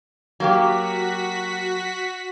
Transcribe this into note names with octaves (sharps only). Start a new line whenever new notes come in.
F#3 A#3 F#4 G4 B6